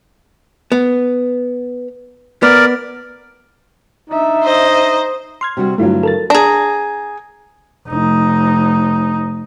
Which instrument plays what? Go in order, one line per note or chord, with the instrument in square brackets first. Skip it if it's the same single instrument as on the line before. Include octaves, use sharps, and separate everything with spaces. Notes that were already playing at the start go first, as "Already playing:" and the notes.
[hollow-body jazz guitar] B3
[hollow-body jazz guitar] B3 [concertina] A#4 D5
[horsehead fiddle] D4 E5 [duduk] D#4
[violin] C5 D#5
[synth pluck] C6 F6 G#6
[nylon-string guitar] C3 G3 F#4
[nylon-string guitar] G2 D3 F#3 [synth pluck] A3 E4 F4
[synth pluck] A4 A#4 A6
[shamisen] D4 [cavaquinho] G#4 A#5
[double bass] F1 D#4